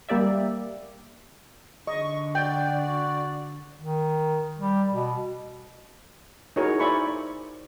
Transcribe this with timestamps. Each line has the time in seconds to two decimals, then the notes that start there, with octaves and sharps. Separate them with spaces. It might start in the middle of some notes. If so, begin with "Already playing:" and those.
0.09 G3 A#3 G4 D5 E5
1.87 D3 D#5 C#6
2.35 F#4 D5 G5
3.81 D#3
4.58 G3
4.92 B2
6.56 D#4 E4 F#4 G#4 A#4 C#5
6.80 C5 D5 E5 G#5 B5 C#6